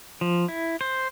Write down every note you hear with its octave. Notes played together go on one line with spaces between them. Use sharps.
F3
E4
C5